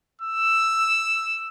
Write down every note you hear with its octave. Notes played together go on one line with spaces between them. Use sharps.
E6